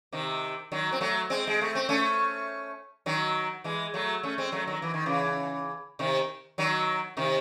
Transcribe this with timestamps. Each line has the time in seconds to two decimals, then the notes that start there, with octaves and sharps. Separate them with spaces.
0.12 C3 D#3
0.72 D#3 F#3
0.92 C4
1.01 F#3 A3
1.30 G#3 C4
1.47 G#3
1.61 A3
1.75 C4
1.89 A3 C#4
3.06 D#3 F#3
3.64 E3 G#3
3.94 F#3 A3
4.23 A3 C#4
4.38 G#3 C4
4.52 F#3 A3
4.67 D#3 F#3
4.82 E3
4.94 D#3
5.06 C#3 E3
5.99 C3 D#3
6.58 D#3 F#3
7.17 C3 D#3